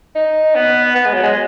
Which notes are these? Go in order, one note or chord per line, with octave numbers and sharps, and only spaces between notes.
D#4
B3
B3
G#3
F#3
G#3